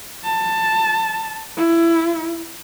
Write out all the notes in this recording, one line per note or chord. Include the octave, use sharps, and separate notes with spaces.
A5
E4